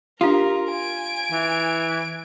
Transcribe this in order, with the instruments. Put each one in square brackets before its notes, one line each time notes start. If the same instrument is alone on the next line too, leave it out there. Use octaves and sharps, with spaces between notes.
[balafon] D4 G4 [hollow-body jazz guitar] F4 [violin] A#4
[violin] G#5 D7
[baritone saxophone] E3